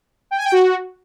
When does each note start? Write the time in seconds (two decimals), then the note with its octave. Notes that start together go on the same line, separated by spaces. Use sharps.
0.31 G5
0.38 G#5
0.45 G5
0.52 F#4